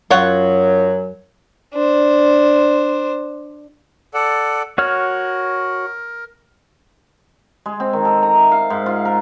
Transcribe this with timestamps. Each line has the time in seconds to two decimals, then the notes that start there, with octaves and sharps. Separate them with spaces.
0.10 F#2 F#3 F4 C#5 F#5
1.74 D4 C5
4.14 A4 D5 F#5
4.78 F#4 A#4 C#5 F6
7.66 G#3
7.80 C4
7.93 D#3
8.05 A4
8.23 A#5
8.36 E5
8.51 F5
8.70 G#2
8.86 F4
9.05 A#4